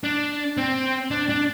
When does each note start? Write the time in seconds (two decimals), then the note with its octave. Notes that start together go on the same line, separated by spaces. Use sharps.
0.04 D4
0.57 C4
1.11 D4
1.29 D4